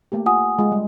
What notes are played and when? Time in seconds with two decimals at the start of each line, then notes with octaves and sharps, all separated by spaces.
0.12 A3 A#3 G4
0.26 F4 F#5 G#5 D#6
0.59 G#3 F4
0.72 G3